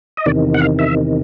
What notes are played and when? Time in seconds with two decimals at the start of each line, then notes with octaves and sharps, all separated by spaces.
0.17 D#5
0.26 E2 C3 D#3 D5
0.54 F#5
0.62 F5
0.79 E5